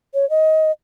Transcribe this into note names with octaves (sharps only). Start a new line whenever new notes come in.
C#5
D#5